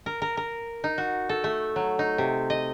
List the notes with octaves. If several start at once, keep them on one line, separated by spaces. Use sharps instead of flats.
A#4
A#4
A#4
D#4
F#4
A4
A3
F#3
D#4
C3
D#5